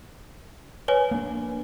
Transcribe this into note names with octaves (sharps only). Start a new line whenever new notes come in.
B4 C#5 G#5
A#3 D4